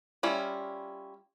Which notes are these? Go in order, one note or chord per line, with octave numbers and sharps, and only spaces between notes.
G3 C#4 E4 F4